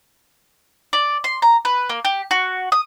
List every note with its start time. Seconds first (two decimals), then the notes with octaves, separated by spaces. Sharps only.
0.93 D5
1.24 C6
1.42 A#5
1.65 B4
1.90 A#3
2.05 G4
2.31 F#4
2.72 D#6